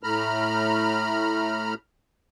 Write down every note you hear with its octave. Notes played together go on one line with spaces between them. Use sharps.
A2 A3 A#5 B5 F6